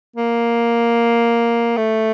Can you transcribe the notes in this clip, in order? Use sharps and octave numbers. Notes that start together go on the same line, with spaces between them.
A#3
A3